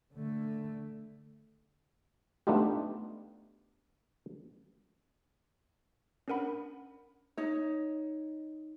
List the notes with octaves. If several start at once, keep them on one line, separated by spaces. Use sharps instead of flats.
D3 A3
A3 B3 D4 D#4 F4 G4
C#4 D4 A#4 F#5 B5
D#4 C#5